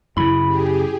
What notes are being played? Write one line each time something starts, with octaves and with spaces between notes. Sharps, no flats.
F#2 C#3 E4 B5
G4 G#4